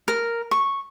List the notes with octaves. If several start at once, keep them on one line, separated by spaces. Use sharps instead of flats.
A#4
C#6